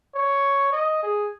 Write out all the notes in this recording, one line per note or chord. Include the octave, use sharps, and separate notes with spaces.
C#5
D#5
G#4